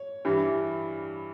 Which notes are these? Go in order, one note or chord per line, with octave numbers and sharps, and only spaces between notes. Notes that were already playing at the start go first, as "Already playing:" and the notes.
Already playing: C#5
G2 E3 G3